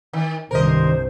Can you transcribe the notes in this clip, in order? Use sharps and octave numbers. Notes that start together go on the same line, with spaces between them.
D#3
C2 G2 C3 D#3 A#4 C5 D#5